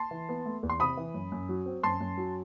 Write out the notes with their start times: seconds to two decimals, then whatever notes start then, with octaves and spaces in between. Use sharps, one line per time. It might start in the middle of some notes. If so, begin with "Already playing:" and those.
Already playing: A5 C6
0.11 E3
0.29 B3
0.46 A3
0.63 E2
0.70 C6
0.80 C3 B5 D#6
0.97 E3
1.14 F#2
1.32 F#2
1.49 F#3
1.66 C4
1.83 F#2 A5 C6
2.01 F#2
2.18 F#3